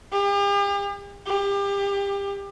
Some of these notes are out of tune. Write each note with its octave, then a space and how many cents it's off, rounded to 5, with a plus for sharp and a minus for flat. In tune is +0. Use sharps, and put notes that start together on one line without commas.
G4 +45
G4 +30